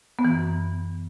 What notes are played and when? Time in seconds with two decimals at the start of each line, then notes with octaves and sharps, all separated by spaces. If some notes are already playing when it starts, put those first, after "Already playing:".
0.19 B3
0.25 E3
0.30 F#2